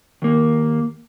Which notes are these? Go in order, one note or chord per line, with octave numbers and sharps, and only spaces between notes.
D#2 A#3